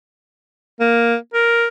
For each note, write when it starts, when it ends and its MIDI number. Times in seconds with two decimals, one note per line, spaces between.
0.80 1.16 58
1.34 1.67 70